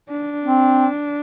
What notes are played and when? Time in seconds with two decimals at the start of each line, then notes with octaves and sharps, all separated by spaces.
0.10 D4
0.44 C4